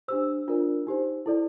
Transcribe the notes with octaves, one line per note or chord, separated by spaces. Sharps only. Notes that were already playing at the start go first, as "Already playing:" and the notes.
D4 G4 C5 E6
D4 F4 A#4 D5
D#4 G4 C5
E4 A4 D5